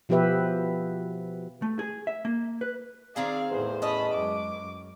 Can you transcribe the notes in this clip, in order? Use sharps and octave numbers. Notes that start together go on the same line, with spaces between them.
B2 F3 B3 G4 B4 E5
A3
G#4
E5
A#3
B4
D#3 C4 G#4 D5 F5
E2 A2 C5
C#4 D#5 A5 B5
F#2 G#3 D6
F#2